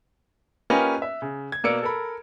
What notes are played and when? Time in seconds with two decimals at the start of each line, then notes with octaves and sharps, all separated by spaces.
0.70 A#3 C#4 F4 G4 B4 D#5
1.02 E5
1.22 C#3
1.52 G#6
1.64 B2 A#3 D5 E6 C#7 D7
1.82 A4 A#4 B5